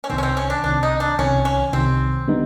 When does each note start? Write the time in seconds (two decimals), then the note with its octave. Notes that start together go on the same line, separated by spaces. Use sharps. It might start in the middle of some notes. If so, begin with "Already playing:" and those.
0.04 C#4
0.10 C2 C3 D#3 C4
0.18 C#4
0.23 C4
0.37 C#4
0.50 D4
0.64 C2 C3 D#3 D4
0.83 D#4
1.00 D4
1.19 C2 C3 D#3 C#4
1.45 C#4
1.73 C2 C3 D#3 C4
2.28 D3 G3 B3 D#4